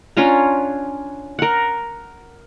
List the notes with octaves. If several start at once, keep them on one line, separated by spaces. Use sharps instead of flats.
C#4 D4 F4 A#5
A#4 F#5